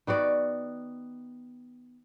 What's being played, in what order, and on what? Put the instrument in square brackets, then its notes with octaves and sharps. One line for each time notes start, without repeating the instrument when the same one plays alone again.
[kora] D#3 B3 F#4 D5